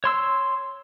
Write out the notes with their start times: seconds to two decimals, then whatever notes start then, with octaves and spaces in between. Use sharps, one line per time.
0.04 C#5 C6 E6